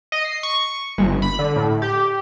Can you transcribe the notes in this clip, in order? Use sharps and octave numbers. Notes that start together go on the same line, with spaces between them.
D#5
C7
C#6
G1
B5
D3
A2
G4